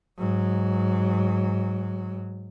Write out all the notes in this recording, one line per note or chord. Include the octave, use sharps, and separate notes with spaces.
G#2 F#3